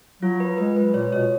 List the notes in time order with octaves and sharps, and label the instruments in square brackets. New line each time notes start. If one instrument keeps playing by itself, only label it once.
[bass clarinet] F#3 [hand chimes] F4
[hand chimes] B4
[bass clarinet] G#3 [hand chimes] B4
[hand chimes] B4
[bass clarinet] A#2 [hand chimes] C#5
[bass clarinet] B2 [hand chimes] C#5